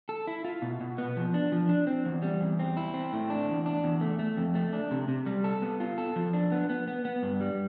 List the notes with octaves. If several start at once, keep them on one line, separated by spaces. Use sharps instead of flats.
A4
E4
F4
B2
B2
B3
F3
D4
F3
D4
C4
E2
G3
E2
C4
E4
C4
A2
D4
E2
D4
E2
A3
A3
F2
A3
D4
C3
C3
G3
A4
B3
F4
A4
F3
D4
B3
B3
B3
B3
G2
G3